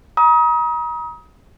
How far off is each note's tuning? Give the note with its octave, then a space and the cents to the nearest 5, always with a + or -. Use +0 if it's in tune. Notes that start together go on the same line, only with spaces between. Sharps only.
A#5 +40 D#6 +30